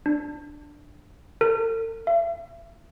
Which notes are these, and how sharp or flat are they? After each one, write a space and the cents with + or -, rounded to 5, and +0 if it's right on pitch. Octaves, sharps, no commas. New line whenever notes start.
D4 +10
A4 +45
E5 +45